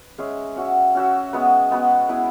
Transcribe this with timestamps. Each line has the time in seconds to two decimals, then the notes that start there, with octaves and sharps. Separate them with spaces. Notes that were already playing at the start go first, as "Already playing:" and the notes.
Already playing: B4
0.18 G#3 C#4 G#4 E5
0.56 C#4 F#4 E5
0.95 C#4 F#4 E5
1.33 G#3 B3 F#4 B4
1.71 G#3 B3 F#4 B4
2.09 B3 E4 G#4 B4